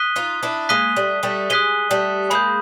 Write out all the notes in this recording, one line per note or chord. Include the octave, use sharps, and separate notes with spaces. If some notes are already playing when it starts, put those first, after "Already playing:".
Already playing: D#6 F#6 B6 D#7 G7
D#4 F4
D4 E4
G#3 A#3 D#6 F#6 B6 D#7 G7
G3 A3
G3 A3
G#3 D#6 F#6 B6 D#7 G7
G3 A3
G#3 A#3 B5 D#6 G6